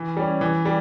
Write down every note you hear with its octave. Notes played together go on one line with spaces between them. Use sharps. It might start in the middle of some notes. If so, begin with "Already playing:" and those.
Already playing: E3
G3 C#4
E3
G3